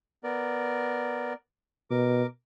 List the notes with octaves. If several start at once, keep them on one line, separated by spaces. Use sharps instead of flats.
B3 A#4 D5
B2 A#4 D6